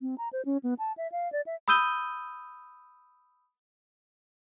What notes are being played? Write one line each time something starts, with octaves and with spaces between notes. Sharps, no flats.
C4
A#5
C5
C#4
B3
A5
E5
F5
D5
E5
B5 D#6 E6 G6 D#7 G7